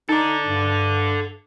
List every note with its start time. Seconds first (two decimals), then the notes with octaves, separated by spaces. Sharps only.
0.09 D#4 A4 D5
0.47 G2